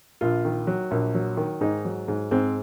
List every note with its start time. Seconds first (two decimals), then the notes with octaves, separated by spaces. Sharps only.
0.21 A#1 F4
0.45 D#3
0.67 F#3
0.91 A#1
1.15 F#3
1.37 D#3
1.61 G#2 D#4
1.85 F#3
2.08 G#2
2.31 G#2 C4